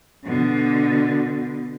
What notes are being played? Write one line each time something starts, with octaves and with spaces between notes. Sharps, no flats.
B2 D3